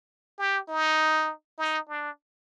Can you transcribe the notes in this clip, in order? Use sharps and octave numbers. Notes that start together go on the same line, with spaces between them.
G4
D#4
D#4
D4